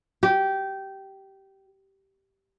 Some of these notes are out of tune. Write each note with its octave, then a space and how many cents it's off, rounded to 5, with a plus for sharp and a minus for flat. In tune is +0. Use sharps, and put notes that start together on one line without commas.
G4 -15